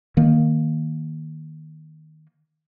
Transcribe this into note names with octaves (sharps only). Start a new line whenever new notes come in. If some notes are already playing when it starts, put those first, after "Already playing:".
D#3 A#3